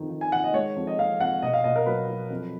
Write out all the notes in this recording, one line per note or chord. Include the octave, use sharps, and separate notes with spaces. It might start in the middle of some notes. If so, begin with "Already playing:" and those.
Already playing: F2 D#3 F3
D#3
G#5
D#3 F#5
D#5
G#3 C#5
F2
D#5
F2 F5
F2 F#5
B2 D#5
F5
B2 D#5
A#4
F#3 B4
F#3
F2